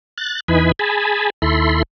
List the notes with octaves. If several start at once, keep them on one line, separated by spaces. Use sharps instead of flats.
F#6 A6
E2 E3 D#4 B4 G#5 B5
G#4 G#5 A5 B5
D#2 E4 A4 B5 C6